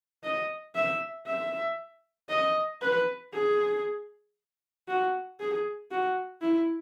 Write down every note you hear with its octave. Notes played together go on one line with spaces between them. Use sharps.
D#5
E5
E5
D#5
B4
G#4
F#4
G#4
F#4
E4